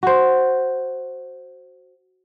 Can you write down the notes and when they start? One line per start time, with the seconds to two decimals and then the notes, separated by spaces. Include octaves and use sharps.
0.03 F#4 C5